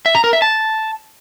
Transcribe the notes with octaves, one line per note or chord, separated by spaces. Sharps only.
E5
A#5
A#4
E5
A5